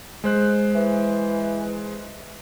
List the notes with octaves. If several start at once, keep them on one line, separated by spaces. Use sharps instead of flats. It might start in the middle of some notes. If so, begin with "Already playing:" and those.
G#3 C5 F#6
E3